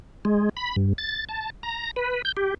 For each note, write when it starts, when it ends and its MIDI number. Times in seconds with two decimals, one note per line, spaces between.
0.25 0.49 56
0.57 0.76 83
0.76 0.93 43
0.98 1.25 93
1.29 1.50 81
1.63 1.91 82
1.96 2.22 71
2.25 2.32 91
2.37 2.54 67